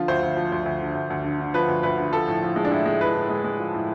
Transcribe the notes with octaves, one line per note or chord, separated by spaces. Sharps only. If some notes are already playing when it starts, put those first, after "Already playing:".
Already playing: D3 F3 F4
D2 C5
D2
F3
D2
D2
D3
D2
D2
D3
D3
F3 B4
D2
D2 B4
D3
F3 A4
A2
F3
G#3
D4
A2 E4
G#3
A2 B4
A2
G#3
G#3
F3
A2